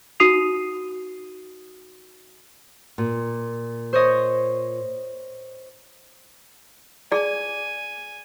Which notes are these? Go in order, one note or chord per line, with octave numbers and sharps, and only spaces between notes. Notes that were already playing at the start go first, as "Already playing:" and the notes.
D#4 F#4 D#6 C7 D#7 F7
A#2
C5 C#5 D#5
G#4 D5 G#5